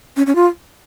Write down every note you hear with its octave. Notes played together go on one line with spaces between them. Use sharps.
C#4
C#4
F4